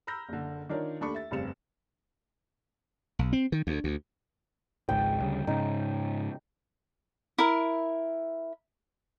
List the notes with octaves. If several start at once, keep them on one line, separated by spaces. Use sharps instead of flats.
A#5 B5 E6 F6 G6 A#6
F#1 D3
D#3 D4 F4 A#4 C#5 D5
D#2 A3 D4 B5 C#6
E5 A6
F1 G2 C#3 C4 C#7 E7
B1
C4
D#3
D2
D2
G#1 C#2 G#2 G5
D2 C#3 G3
G#2 C#3 D#4
E4 A#4